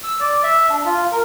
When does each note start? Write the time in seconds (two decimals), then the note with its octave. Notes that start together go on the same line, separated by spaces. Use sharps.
0.04 E6
0.20 D5
0.43 E5
0.70 D4
0.85 F4
1.12 A#4